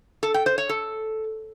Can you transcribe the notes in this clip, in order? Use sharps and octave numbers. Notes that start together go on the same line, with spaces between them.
A4
G5
C5
C#5
A4